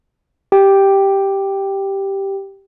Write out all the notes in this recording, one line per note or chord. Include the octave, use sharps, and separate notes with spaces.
G4 G5